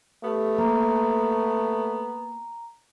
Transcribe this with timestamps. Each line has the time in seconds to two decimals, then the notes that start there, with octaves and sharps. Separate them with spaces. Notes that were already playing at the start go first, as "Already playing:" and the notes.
0.24 A3 B3 G4
0.58 A#3 A#5